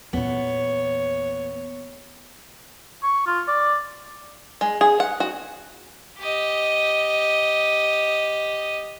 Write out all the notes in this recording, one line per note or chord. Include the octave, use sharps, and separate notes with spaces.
E2 A#2 B3 C#5
C#6
F4
D5
G#3
G#4
F#5
F#4
G4 D#5